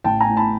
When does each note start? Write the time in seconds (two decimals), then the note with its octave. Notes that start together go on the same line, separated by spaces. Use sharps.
0.04 A1 G5 A5
0.21 G#5 A#5
0.29 A2
0.37 A5 B5